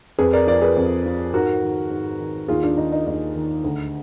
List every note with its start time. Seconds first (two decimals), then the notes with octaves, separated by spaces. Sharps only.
0.19 F2 G#4 B4
0.33 A#4 D5
0.47 F3 A#4 D5
0.61 G#4 B4
0.77 F2
1.05 F3
1.34 G#2 F#4 A#4
1.63 D#3
1.91 G#2
2.20 D#3
2.48 D#2 F4 G#4
2.63 D4 F4
2.77 D#3 D#4
2.92 D#4
3.07 D#2 D#4
3.36 D#3
3.64 D2